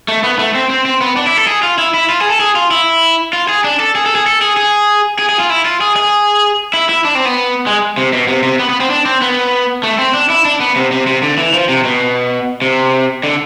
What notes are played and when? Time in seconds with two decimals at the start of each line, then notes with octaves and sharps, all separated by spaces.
0.08 A3
0.24 B3
0.39 A3
0.55 C4
0.70 C4
0.86 C4
1.01 B3
1.16 D4
1.27 E4
1.37 A4
1.47 G#4
1.63 F4
1.78 E4
1.94 E4
2.09 F4
2.20 G#4
2.30 A4
2.40 G#4
2.56 F4
2.71 E4
3.33 F4
3.49 G#4
3.64 D4
3.80 A4
3.95 G#4
4.06 A4
4.15 G#4
4.26 A4
4.42 G#4
4.57 G#4
5.19 G#4
5.29 G#4
5.40 F4
5.50 E4
5.66 F4
5.81 G#4
5.96 G#4
6.74 E4
6.89 E4
7.05 D4
7.15 C4
7.25 B3
7.67 G#3
7.98 C3
8.13 B2
8.28 C3
8.43 C3
8.60 B3
8.70 B3
8.80 C4
8.90 D4
9.06 C4
9.22 B3
9.83 A3
9.99 C4
10.14 D4
10.30 E4
10.45 D4
10.60 B3
10.76 C3
10.92 C3
11.07 C3
11.23 D3
11.38 E3
11.53 F3
11.69 C3
11.84 B2
12.62 C3
13.24 D3